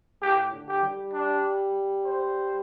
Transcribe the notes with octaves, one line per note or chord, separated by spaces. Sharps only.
A2 G4
D3
G4
G3
D4
C5